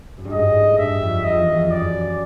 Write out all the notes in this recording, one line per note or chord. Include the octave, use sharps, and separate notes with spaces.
F#2
G2
G#2 D#5
A2
G2 E5
F2
F2 D#5
E2
F2
F#2 D5